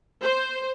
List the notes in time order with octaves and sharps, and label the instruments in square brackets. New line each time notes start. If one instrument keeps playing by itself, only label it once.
[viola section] C5